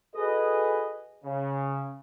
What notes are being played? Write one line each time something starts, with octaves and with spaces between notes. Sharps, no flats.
F#4 G#4 A4 B4 D#5
C#3